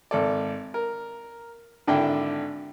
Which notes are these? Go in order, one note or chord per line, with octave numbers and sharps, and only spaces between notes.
G#1 A4 D5
A#4
G#1 D3 D4 E4 G5